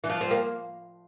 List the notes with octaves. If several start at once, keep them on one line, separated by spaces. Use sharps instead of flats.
E3
F3
C4
A#3